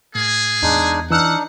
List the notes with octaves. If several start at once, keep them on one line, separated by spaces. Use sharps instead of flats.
A2 A#3 G#4
E2 G#3 D4 D#4
E3 D4 D#4 F#5 E6 F6